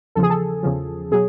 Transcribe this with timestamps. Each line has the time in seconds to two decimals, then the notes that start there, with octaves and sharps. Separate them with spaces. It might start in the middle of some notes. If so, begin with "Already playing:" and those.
0.15 E2 C#3 F3 A4
0.23 G#4
0.30 A4
0.63 E2 C#3 F3
1.11 B2 F#3 G#4